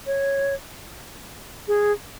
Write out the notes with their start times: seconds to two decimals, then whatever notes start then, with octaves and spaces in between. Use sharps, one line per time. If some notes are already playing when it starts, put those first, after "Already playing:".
0.07 C#5
1.68 G#4